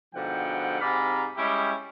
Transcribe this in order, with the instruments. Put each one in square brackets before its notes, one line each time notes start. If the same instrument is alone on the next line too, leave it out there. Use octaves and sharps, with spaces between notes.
[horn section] G#2 B2 D3 F3 F#5 G5
G#2 C3 D5 F5 A#5 B5
G3 G#3 C#4 E4 G4